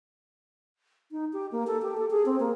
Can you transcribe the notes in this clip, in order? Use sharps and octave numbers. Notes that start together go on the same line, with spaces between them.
D#4
G4
A#3
A4
G4
A4
G#4
C4
A#3